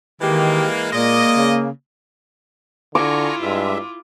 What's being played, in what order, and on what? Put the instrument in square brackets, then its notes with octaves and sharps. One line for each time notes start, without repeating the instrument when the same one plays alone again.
[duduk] D#3 [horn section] E3 G#3 A#3 [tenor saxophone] G4
[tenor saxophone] A#2 [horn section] G#3 D5 D#5 [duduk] A#3
[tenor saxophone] C#3
[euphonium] D3 [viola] E4 F4 [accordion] G#5 A#5 C#6 [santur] D6
[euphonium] G2 [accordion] G#3 E5